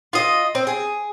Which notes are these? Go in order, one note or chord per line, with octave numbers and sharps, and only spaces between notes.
F4 D#5
C4
G#4